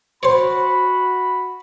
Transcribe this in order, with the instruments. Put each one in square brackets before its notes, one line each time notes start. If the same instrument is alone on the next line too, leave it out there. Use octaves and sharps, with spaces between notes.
[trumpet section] F#4 B5 [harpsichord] C5 C#5